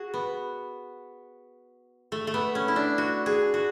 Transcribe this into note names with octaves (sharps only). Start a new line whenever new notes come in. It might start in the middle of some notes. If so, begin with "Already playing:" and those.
Already playing: F#4 G#4
B3
A3
A3
B3
C#4
E4
D4
F#4
G#4
F#4